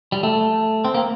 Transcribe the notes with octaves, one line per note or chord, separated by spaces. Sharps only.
G3
A3
C4
A#3